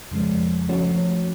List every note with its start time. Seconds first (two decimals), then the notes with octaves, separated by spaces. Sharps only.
0.12 F2 C#3 F3 G#3
0.69 F3 A3 C#4 F#4 C#5